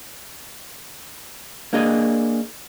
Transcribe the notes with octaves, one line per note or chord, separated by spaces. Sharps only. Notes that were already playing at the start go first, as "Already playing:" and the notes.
A#3 D4 G#4 D#5